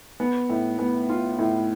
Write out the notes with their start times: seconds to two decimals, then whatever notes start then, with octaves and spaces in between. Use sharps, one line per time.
0.20 B3
0.49 A2
0.79 B3
1.09 F4
1.39 A2